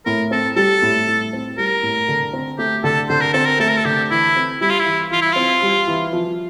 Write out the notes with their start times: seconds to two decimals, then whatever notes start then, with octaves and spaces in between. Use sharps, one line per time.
0.06 A2 A#4
0.31 C4 A4
0.56 G3 A4
0.82 A2
1.08 A2
1.33 C4
1.58 G3 A#4
1.83 A2
2.08 D3
2.33 C4
2.59 A3 G4
2.84 D3 A4
3.09 D3 C5
3.21 A#4
3.33 C4 A4
3.45 A#4
3.60 A3 A4
3.69 A#4
3.77 A4
3.85 D3 G4
4.11 E3 E4
4.36 C4
4.61 G3 E4
4.70 F4
4.79 E4
4.86 E3
5.11 E3 F4
5.21 E4
5.32 C4 F4
5.62 G3
5.87 E3
6.13 F3